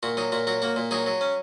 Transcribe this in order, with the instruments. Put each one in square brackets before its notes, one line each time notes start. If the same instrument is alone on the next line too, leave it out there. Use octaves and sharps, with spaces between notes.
[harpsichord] A#2 F#4
F#3 D#4
A#2 F#4
F#3 F#4
A#3 F#4
A#2
F#3 D#4 G#4
F#3
C#4